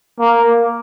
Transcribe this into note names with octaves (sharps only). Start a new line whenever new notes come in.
A#3